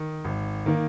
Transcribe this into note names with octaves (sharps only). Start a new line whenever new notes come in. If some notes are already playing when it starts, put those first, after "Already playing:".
Already playing: D#3
G#1
D#3 A#3